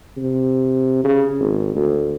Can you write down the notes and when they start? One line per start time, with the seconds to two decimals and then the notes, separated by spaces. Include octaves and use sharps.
0.17 C3
1.04 C#3
1.40 G#1
1.75 D2